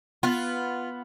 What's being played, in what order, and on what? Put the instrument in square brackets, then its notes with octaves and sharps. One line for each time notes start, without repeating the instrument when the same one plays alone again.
[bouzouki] B3 [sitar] F4